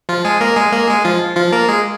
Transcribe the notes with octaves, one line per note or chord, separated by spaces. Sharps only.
F3 F4
G#3 G#4
A#3 A#4
G#3 G#4
A#3 A#4
G#3 G#4
F3 F4
F3 F4
A#3 A#4
G#3 G#4